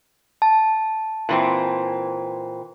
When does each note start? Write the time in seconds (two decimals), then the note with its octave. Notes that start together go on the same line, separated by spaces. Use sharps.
0.42 A5
1.29 A#2 E3 C4